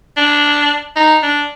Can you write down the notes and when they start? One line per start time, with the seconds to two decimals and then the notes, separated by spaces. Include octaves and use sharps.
0.17 D4
0.96 D#4
1.23 D4